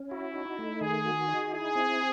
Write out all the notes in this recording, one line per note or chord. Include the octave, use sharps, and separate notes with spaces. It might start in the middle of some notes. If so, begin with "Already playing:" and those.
Already playing: C#4
E4 F#4
D#4
A3
D#3 G#4
F#4
D#4
E4 G#4
C4